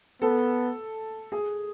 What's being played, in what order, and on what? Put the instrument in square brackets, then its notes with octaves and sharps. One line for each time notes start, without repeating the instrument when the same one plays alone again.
[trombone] B3 [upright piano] A4
[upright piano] G#4